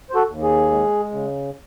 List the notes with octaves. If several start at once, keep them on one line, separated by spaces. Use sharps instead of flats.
C5
F#4 A4
D#2
G#4
G#3
C#3